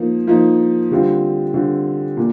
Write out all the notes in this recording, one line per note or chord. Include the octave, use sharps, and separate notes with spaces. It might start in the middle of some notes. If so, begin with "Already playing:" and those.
Already playing: F3 A#3 D#4
F3 A#3 D#4
D3 G3 C4 F4
D3 G3 C4 F4
A#2